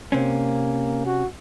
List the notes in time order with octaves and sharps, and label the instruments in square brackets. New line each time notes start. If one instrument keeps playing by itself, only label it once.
[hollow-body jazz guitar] C3 C4 C#4 [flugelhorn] A#3
[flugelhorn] F#4